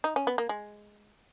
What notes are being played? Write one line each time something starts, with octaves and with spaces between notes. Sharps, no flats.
D#4
C#4
B3
A#3
G#3